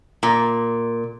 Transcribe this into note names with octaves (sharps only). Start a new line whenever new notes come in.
A#2